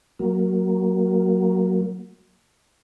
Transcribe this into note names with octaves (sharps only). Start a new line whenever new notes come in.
F#3 A#3